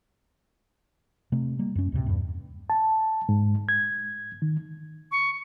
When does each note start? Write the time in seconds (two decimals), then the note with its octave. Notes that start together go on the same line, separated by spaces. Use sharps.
1.32 C3 A3 C4
1.59 G3 A#3
1.75 F#2 C#4
1.92 D2 A2 C3
2.06 E2 G2
2.70 A5
3.29 G#2
3.69 G#6
4.42 D#3
5.11 C#6